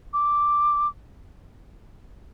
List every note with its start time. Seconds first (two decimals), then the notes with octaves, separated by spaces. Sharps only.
0.13 D6